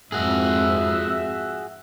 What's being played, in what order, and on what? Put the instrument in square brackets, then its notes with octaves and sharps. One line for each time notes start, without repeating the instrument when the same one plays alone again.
[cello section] F2 G#2 [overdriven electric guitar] F#4 G#4 [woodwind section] E5